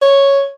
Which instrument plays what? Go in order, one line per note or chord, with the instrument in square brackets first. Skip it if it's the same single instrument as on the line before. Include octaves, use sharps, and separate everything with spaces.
[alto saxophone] C#5